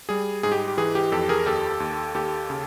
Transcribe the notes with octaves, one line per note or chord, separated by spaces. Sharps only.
G3 G#4
G#2 G#4
G4
G4
E3 G#4
G4
F2 G4 A4
G#4 A#4
D#2 G4 A4
D#2
D#2 G4 A4
C#3